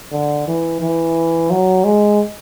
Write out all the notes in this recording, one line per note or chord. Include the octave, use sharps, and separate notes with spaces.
D3
E3
E3
F#3
G#3